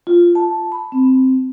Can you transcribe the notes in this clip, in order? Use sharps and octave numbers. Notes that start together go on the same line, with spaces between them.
F4
A5
B5
C4